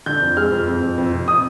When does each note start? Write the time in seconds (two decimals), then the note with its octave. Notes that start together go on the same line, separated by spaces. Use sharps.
0.06 D3 G6
0.22 F2
0.37 G#3 F6
0.52 F2
0.68 F2
0.82 F2
0.98 F2
1.13 C3
1.28 D#6